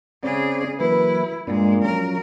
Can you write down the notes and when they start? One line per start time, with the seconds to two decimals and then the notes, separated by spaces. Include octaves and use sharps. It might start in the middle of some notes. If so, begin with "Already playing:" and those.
0.23 C#3 C4 C#4 G#4 D5
0.80 E3 F#3 A#3 E4 B4
1.47 G2 A#2 G#3 A#3 D4
1.84 F3 F#3 C#4 A#4